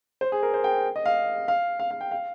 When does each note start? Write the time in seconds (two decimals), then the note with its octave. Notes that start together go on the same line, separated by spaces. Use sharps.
0.21 C5
0.32 G#4
0.43 A#4
0.54 C5
0.64 G5
0.96 D#5
1.06 F5
1.48 F5
1.79 F5
1.91 F5
2.01 G5
2.11 F5